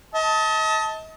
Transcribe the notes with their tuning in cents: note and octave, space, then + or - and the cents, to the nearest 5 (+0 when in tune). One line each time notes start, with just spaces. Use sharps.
D#5 +35 A5 +0